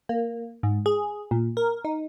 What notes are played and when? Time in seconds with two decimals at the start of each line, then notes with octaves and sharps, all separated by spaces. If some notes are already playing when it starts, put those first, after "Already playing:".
0.09 A#3
0.63 G#2
0.86 G#4
1.31 A#2
1.57 A#4
1.85 D#4